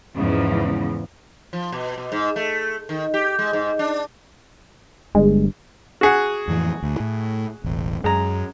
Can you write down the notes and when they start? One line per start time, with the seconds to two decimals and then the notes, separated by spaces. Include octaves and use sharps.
0.16 E2 G#2 C#3 E3 F3
1.53 F3
1.72 B2
1.98 B2
2.12 G#2
2.36 A3
2.89 D#3
3.14 G4
3.39 G#3
3.53 G#2
3.79 D4
5.15 G1 G2 G#3
6.01 F#4 G#4 F#5
6.48 F2 A2 E3
6.82 D2
7.00 A2
7.64 E1 A1
8.04 F#2 G#3 A#5